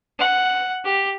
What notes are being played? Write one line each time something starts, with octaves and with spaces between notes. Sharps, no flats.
F#5
G4